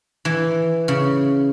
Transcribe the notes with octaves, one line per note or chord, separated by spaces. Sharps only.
E3
C#3